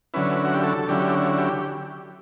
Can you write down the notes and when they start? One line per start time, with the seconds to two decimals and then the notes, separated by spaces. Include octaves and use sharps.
0.14 D3 F#3 C#4 E4 B4
0.45 F#4
0.54 G4
0.64 A4
0.89 D3 F#3 C#4 E4 G4
1.39 G4